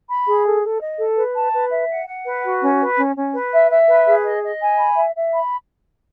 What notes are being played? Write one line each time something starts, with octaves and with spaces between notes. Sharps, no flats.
B5
G#4
A4
A4
D#5
A4
B4
A5
B4
E5
F#5
F#5
B4
F#4
C#4
B4
C#4
C#4
B4
E5
E5
B4
G#4
D#5
D#5
G#5
B5
E5
E5
B5